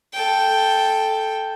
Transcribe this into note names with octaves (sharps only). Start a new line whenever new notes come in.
A4 G5